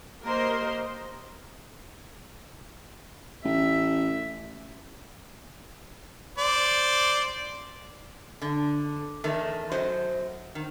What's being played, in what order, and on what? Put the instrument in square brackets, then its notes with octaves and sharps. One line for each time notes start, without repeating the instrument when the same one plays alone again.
[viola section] A#3 G4 A#4 C5 D#5 C6
[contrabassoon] A1 [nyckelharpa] E5
[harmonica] C5 D5
[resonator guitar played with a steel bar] D3
E2 D#3 A3
F#2 F#3 C5 D#5
D#3